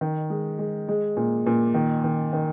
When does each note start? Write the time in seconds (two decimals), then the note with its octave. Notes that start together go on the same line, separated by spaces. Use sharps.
0.01 D#3
0.30 G#3
0.59 G#3
0.89 G#3
1.17 A#2
1.46 A#2
1.74 D#3
2.04 D#3
2.33 D#3